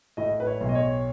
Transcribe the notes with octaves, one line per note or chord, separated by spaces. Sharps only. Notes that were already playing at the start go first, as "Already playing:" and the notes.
A2 D#5
B4
C#5
B1
D#5
C#5